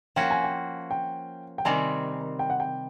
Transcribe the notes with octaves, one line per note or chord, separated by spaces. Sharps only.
F3 A#3 C#4 F#4 G5
G#5
G5
G5
G5
C3 D#3 G3 C4 G#5
G5
F#5
G5